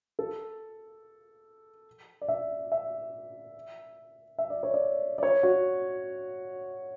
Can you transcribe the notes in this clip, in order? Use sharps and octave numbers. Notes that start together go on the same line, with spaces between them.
A4
D5
E5
E5
E5
D5
C#5
D5
D5
C#5
F#4